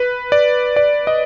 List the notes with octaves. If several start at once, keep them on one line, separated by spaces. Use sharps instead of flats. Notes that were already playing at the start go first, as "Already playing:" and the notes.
Already playing: B4
D5
D5
D#5